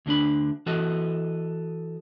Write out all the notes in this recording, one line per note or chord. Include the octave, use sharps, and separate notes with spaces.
D2 D3 D4 B5
E3 F#4 A4 D#5